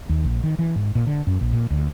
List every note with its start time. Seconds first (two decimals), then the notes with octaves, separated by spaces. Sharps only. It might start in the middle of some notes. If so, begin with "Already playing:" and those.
0.09 D#2
0.25 A#1
0.44 D#3
0.59 E3
0.76 G#2
0.95 A#2
1.07 D3
1.27 F#2
1.41 A#1
1.53 A#2
1.70 D2